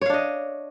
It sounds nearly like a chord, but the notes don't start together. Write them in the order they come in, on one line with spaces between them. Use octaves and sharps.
C#5 F5 D4 D#5